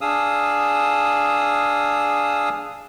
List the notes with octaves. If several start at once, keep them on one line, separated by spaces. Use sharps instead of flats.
D4 G#4 F5 D#6 E6